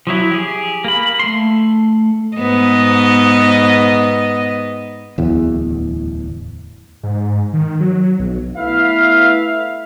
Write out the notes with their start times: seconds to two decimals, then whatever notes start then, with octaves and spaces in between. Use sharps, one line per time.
0.07 F3 F#3 E4
0.31 G4 G#4
0.84 A#3 B5
1.20 A3 C6
2.37 G#2 B3 D#5
5.18 D1 E2
7.03 G#2
7.53 D#3
7.80 F#3
8.19 B1
8.57 A3 B3 E4 B4 E5 F5